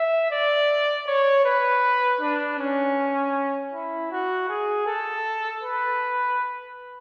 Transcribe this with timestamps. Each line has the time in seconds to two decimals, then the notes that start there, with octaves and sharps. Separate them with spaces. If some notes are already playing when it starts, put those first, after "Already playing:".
Already playing: E5
0.31 D5
1.07 C#5
1.45 B4
2.21 D4
2.59 C#4
3.73 E4
4.11 F#4
4.49 G#4
4.87 A4
5.63 B4